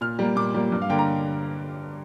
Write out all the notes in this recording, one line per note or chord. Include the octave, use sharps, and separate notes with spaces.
A#2 F6
G3 A#3
A#2 D6
G3 A#3
G2
F5
D3 A#3 G5
A#5